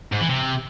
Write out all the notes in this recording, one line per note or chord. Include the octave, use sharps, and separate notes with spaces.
G#2
E3
C3